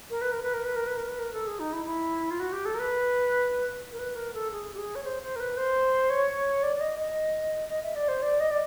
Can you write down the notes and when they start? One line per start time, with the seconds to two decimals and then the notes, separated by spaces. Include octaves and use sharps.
0.10 A#4
0.21 B4
0.32 A#4
0.43 B4
0.54 A#4
0.65 B4
0.76 A#4
0.87 B4
0.97 A#4
1.08 B4
1.19 A#4
1.33 A4
1.47 G#4
1.59 D#4
1.73 E4
1.86 E4
2.31 F4
2.40 F#4
2.52 G4
2.65 A4
2.74 A#4
2.79 B4
3.92 A#4
3.99 B4
4.15 A#4
4.34 A4
4.52 G#4
4.74 G4
4.78 G#4
4.95 C#5
5.04 C5
5.22 C5
5.36 A#4
5.40 B4
5.57 C5
6.10 C#5
6.63 D5
6.76 D5
6.81 D#5
6.99 D#5
7.69 D#5
7.83 E5
7.96 D5
8.08 C5
8.22 D5
8.40 D#5
8.51 D5